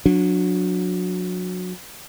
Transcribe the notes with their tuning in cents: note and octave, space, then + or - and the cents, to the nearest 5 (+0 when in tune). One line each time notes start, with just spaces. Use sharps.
F#3 -25 D4 +0